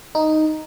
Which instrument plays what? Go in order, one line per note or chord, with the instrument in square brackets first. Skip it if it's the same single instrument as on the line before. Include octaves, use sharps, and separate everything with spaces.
[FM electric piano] D#4